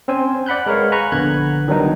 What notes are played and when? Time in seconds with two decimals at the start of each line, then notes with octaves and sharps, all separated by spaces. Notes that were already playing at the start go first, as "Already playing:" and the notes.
0.08 C4 C#4 C5 G#5
0.46 D5 F#5 B5 F#6 G6
0.66 G#3 A#4 B4 C#5 F5
0.92 G#5 A#5 B5 C#6 F#6
1.12 A#1 D3 B3 F#6 G#6
1.68 D#3 F#3 G3 B3 D4 D#4